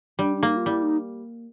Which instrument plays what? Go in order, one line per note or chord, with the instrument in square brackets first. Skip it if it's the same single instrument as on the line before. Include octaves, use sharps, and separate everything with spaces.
[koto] G3 [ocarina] D4
[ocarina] D4
[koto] A#3 [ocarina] D#4
[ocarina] F4
[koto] G3 [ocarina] E4
[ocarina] D#4